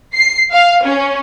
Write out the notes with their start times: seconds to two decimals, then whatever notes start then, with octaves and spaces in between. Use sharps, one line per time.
0.15 C7
0.53 F5
0.85 C#4